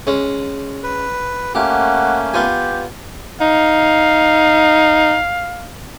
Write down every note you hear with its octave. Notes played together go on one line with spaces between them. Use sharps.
G#3 C#4
B4
A3 A#3 C#4 G4 F#5
F#5
B3 F4 G4 G#5
D#4 F5